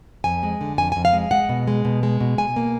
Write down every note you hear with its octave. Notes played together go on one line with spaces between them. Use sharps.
F2 G#5
G#3
D3
F2 G#5
F2 G#5
F5
G#3
G#3 F#5
B2
G#3
B2
G#3
B2
B2 G#5
A#3